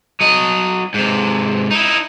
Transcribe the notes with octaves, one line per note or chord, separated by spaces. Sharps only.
F#3 D#5
G#2 C3
D#4 E4